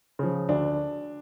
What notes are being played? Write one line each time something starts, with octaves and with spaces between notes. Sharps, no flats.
C#3 F3
D2 D4